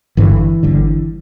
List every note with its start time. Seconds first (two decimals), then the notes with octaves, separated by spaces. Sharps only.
0.17 G1 G2 D3 E3
0.63 G1 G2 D3